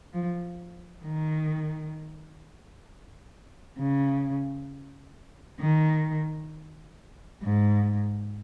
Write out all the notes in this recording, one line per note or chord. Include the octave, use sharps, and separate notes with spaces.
F3
D#3
C#3
D#3
G#2